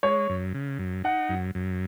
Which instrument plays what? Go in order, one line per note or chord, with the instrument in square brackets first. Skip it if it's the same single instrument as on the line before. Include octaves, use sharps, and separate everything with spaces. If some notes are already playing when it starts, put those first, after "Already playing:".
[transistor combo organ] G#3 [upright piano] C#5
[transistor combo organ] F#2
C#3
F#2
[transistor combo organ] D#4 [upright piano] F#5
[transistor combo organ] F#2
F#2